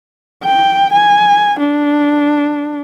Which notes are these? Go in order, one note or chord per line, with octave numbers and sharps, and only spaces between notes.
G5
G#5
D4